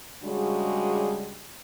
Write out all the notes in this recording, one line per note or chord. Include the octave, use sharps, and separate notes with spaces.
C#3 G3 G#3 D4 F#4